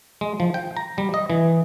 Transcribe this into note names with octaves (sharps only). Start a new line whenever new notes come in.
G#3
F3
G5
A#5
G3
D#5
E3